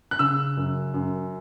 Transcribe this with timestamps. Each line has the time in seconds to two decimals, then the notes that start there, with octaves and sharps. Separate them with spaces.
0.11 F#6
0.19 C#3 E6
0.57 F#2
0.94 F#2